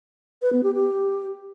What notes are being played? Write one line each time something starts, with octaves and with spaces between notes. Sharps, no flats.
B4
B3
G4
G4